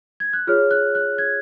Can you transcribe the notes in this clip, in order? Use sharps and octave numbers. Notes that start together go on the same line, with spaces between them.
G#6
F#6
F4 G#4 C#5 F6
F#6
F#6
G#6